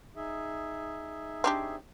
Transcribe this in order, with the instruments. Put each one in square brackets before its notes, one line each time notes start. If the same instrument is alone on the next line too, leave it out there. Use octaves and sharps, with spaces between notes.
[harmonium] D#4 G#4 E5
[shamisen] C4 D4 G4